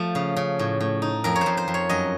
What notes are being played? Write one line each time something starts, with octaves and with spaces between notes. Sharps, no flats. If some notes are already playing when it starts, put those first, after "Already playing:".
Already playing: F3 A3
C#3
C#3
A2
A2
D#4
F2 A#4
C#5
F2 C5
C5
F2
C#5
F#2 D#5